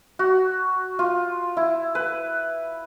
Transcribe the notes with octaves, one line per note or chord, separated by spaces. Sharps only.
F#4
F4
E4
B4